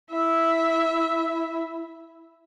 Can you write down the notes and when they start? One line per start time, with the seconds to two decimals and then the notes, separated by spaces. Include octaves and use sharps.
0.11 E4 E5